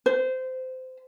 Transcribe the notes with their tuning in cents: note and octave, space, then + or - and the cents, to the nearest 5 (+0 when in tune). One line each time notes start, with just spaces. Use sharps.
C5 -20